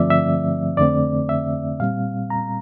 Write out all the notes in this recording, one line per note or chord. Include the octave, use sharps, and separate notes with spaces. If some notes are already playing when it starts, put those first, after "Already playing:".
Already playing: G2 D3 F3 A3 C4 D5 E5
E5
F2 D3 A3 C4 D5
E5
A#2 G3 C4 F5
A#5